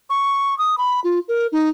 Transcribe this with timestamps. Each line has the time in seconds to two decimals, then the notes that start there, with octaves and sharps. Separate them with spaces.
0.10 C#6
0.58 D#6
0.78 B5
1.04 F4
1.28 A#4
1.52 D#4